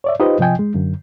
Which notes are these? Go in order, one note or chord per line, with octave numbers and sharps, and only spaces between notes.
C#5 D5 E5
D#4 F4 G4 B4 C5 D#5
C3 F3 D#5 G5 G#5
G#3
F#2 D3